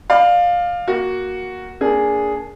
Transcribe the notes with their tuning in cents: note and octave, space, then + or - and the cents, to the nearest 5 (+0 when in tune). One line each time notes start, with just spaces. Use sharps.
D5 +30 F5 +10
A#3 +0 F#4 +0
A#3 +0 D4 -25 G#4 +0